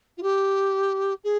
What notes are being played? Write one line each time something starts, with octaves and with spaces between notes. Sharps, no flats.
F4
G4
G#4